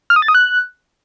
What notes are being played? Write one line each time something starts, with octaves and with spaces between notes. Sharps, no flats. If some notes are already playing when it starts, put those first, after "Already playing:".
F6
D#6
A6
D#6
F#6